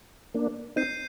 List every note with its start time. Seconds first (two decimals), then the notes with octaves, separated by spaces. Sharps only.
0.34 A#3 D4
0.76 C4 D#4 G6 C7 D#7